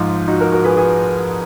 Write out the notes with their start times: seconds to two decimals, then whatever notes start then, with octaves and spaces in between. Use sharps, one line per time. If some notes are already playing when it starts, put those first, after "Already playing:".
Already playing: G#2 F3 D#4
0.28 D#4 F#4
0.40 F#4 A#4
0.52 F#4 A#4
0.64 G#4 B4
0.77 G#4 B4